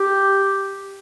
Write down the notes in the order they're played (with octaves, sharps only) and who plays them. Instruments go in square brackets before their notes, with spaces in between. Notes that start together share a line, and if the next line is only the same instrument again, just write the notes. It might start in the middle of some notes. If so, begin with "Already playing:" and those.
Already playing: [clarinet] G4